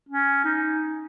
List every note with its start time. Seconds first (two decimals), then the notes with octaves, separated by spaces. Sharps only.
0.09 C#4
0.44 D#4